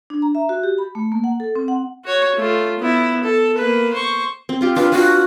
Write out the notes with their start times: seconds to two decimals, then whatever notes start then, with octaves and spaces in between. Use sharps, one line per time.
0.10 D4
0.22 A#5
0.35 E5
0.49 F#4
0.63 G4
0.78 B5
0.95 A3
1.12 A#3
1.24 F#5
1.40 A4
1.56 C4
1.68 F#5
2.04 F#4 C#5
2.36 A3 F4
2.79 B3 E4
3.24 A4
3.58 A#3 B4
3.94 C5 C#6
4.49 C4
4.61 C4 F4 G4
4.76 D4 F4 G4 B4
4.92 F4 F#4 B4